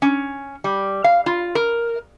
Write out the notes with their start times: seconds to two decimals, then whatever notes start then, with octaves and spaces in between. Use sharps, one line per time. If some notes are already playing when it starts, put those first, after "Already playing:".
0.02 C#4
0.64 G3
1.04 F5
1.26 F4
1.55 A#4